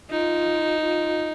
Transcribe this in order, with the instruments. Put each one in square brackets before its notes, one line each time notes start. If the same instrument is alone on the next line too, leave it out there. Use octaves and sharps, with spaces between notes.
[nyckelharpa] D#4 [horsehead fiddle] F4
[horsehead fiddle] F4